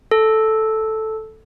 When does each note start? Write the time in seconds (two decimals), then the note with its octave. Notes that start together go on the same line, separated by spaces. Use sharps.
0.11 A4